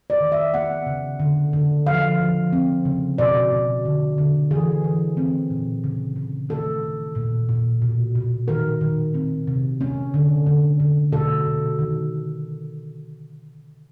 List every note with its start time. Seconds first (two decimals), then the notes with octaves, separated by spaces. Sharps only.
0.10 D5
0.21 D#3
0.32 E5
0.54 B3 F#5
0.86 C#3
1.20 D3
1.53 D3
1.86 F3 F5
2.20 F3
2.53 C4
2.85 C#3
3.18 B2 D5
3.51 B2
3.85 D3
4.18 D3
4.51 E3 G#4
4.84 E3
5.17 C4
5.50 A#2
5.84 C#3
6.16 C#3
6.49 D#3 A4
6.83 D#3
7.15 A#2
7.49 A#2
7.82 B2
8.15 B2
8.48 D#3 A#4
8.81 D#3
9.14 C4
9.47 C3
9.81 C#4
10.14 D3
10.46 D3
10.80 D3
11.12 B2 A4
11.46 B2
11.79 D#3